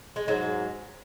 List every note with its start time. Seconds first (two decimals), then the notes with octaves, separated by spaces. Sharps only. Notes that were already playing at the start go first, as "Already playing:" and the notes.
0.16 G#3
0.28 G#2 F#3